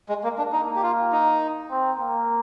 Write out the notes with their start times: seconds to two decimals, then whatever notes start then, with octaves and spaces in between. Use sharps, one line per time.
0.09 G#3
0.24 A#3
0.38 D4
0.52 A#3 D#4
0.76 G4
0.83 F4
1.12 D#4
1.71 C4
2.00 A#3